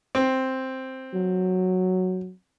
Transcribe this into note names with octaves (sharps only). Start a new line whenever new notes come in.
C4
F#3